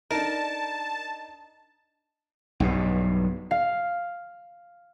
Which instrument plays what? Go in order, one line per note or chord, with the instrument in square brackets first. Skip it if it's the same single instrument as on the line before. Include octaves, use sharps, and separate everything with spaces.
[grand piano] D4 D#4 [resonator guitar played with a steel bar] A#4 [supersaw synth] A5
[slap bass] B1 G2 B2
[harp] F5